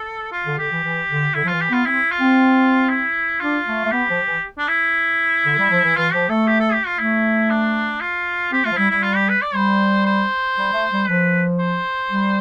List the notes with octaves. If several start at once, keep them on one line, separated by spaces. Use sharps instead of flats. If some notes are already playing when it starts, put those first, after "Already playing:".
Already playing: A4
F4
D3
D3 G4
E3
E3
D3
D3 E4
F3
E3 F4
G4
B3 F4
C4 E4
F4
C4
E4
D4 F4
A3
A3
B3 G4
F3
E3
D4
E4
D3
G3
F3
E3
E3 F4
F3 G4
A3 A4
G4
A4
G4
F4
A3 E4
D4
F4
C4 G4
A3 F4
F3
G3 E4
G3 E4
F4
G4
B4
D5
G3 C5
C5
G3
A3
G3
F3 B4
C5
G3